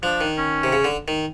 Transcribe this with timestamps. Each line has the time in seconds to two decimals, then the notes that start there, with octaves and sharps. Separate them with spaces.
0.03 F3 D4
0.21 D#3
0.38 C#4
0.64 C3
0.72 C#3
0.84 D3
1.08 D#3